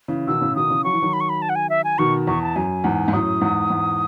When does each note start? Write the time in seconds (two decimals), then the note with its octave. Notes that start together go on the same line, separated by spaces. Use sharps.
0.08 C#3 E3
0.27 B2 D#3 E6
0.41 A2 C#3
0.56 B2 D#3 D#6
0.70 C#3 E3
0.84 F#3 C#6
0.93 E3
1.02 D#3 F#3
1.13 B5
1.21 C#6
1.29 B5
1.42 A5
1.49 F#5
1.55 G#5
1.70 E5
1.84 G#5
1.98 B2 D#3 C#6
2.27 E2 C#6
2.42 A5
2.56 F#2 G#5
2.84 E2 G#2
3.08 G#2
3.13 F#2 A2 D#6
3.41 E2 G#2
3.70 E2 G#2